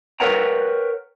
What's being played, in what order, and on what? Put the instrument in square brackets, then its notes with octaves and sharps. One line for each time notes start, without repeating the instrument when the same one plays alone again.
[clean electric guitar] A#4 B4 C#5 F#5 G5 A#5